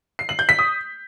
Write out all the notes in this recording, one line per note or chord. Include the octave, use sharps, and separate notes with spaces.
C7
F#7
G6
B6
D#6